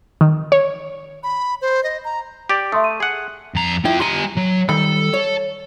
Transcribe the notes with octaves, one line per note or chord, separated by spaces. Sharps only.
D#3
C#5
B5
C5
D#5
A#5
G4 D5
A3 E5 C6 D#6
D#7
G#4 F#5
F2 A#5
E4 F4 G5
G3 G#5 A#5 C6
F#3
D#3 G3 A4 B5
C#5